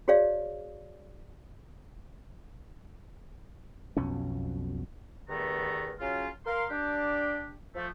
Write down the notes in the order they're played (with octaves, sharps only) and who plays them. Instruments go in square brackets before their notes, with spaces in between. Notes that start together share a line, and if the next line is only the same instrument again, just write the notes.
[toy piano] F#4 G#4 C#5 D5 F5
[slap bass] B1 F2 B2 C#4
[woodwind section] E2 G2 D#3 A3 B3 A#5
C#3 F#3 C#4 F4
A#4 F5 C6
D4 G4
F3 A3